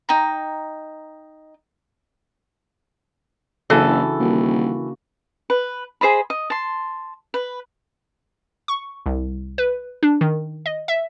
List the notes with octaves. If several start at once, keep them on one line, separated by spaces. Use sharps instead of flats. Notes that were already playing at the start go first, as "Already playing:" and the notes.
D#4 G5 A#5
F#1 C#3 E3 D4 F#4 A4
D#1 A#3 F#4
B4
G#4 C5 D#5 B5
D#5
A5 C6
B4
C#6
C2
B4
D4
D#3
D#5
E5